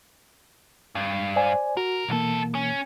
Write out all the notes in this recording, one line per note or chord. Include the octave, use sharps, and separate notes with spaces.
G2
C5 D5 G#5
F#4 A#4
C2 B2 E3 A#3 A4
C#4